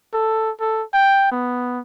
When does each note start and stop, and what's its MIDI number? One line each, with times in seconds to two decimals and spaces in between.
0.14 0.51 69
0.61 0.83 69
0.94 1.28 79
1.32 1.80 59